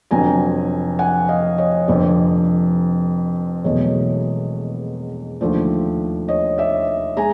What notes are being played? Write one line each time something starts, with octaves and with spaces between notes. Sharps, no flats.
F1 F2 D3 F#3 G#5 A#5
F#5 G#5
D#5 F5
C#5 D#5
F1 F2 D3 C5 D5
E1 E2 B2 F#3 A3 C#5 D#5
D#2 D3 F3 A3 C5 D5
C#5 D#5
D5 E5
G#3 G#5 A#5